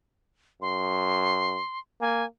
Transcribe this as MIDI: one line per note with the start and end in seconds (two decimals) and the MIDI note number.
0.62 1.59 42
0.62 1.79 84
2.01 2.25 58
2.01 2.25 80